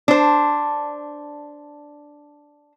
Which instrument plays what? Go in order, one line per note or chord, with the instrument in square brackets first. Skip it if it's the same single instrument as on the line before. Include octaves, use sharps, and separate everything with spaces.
[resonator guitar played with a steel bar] D4 C5